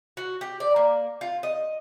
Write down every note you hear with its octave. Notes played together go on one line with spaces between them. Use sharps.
F#4
G4
D5
A#3
F4
D#5